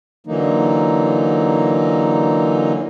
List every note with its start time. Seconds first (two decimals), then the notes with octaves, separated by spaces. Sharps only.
0.27 D3 E3 F#3 A#3 D#4